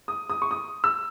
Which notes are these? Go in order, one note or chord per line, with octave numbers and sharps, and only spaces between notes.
D#6
D#6
C#6
D#6
E6